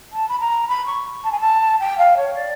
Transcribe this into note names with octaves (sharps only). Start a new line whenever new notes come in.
A5
B5
A#5
B5
C#6
A5
G#5
A5
G5
F5
C#5
D5